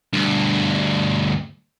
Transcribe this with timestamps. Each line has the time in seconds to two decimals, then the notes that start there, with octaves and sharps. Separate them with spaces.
0.13 D2 G2